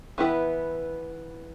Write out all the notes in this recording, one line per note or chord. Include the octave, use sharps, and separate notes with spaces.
E3 B3 E4 B4